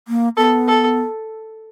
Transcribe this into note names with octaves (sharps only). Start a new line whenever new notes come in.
A#3
B3 A4
A4